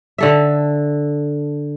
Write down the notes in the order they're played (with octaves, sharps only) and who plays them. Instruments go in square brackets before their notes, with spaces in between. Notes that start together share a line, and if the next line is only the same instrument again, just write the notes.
[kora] D3 A4 E5